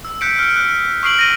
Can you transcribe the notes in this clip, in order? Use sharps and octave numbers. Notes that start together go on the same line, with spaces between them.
E6
E6 F#6 G6 B6 C#7 D7
F6 D7
F#6
C#6 D#6 F6 C7 D7 F#7
A#6 D#7 G7